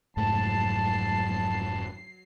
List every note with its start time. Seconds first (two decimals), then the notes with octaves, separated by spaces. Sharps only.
0.17 F1 G#2 F#3 A3 A5 C7